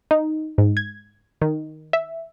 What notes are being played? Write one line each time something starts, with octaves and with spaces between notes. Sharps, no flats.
D#4
G#2
G#6
D#3
E5